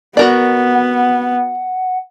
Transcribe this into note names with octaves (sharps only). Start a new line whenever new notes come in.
B3 F#4 A#4 D5
F#5